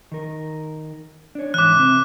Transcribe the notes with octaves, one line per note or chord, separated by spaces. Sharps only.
D#3 A#4
D4 C#5
G#2 E3 D6 F#6
C3 C4